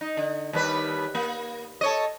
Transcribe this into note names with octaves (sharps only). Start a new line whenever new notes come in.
D#4
D3
D#2 G3 B4
A#3
A4 C#5 D#5